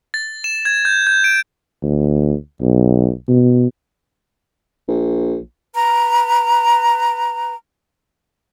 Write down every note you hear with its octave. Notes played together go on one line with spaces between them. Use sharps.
A6
E7
G#6
G6
G6
D7
D2
B1
B2
A#1
B4 A#5